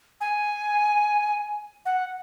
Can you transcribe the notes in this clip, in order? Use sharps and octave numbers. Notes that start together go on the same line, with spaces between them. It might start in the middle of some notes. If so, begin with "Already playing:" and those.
G#5
F#5